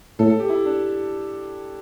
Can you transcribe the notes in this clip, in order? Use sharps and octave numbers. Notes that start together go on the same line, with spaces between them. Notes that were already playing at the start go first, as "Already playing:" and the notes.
A2 A4
A4
G4
E4
D4